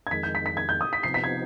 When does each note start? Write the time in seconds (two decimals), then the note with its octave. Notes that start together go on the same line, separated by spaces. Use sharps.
0.07 G#6
0.11 F2 D#3 G#3 B6
0.23 G6
0.35 B6
0.46 B6
0.57 G#6
0.69 G6
0.81 D#6
0.93 B6
1.03 C3 F3 B3 D#4 C7
1.14 B6
1.24 G#6